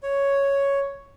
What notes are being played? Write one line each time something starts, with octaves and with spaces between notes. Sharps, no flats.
C#5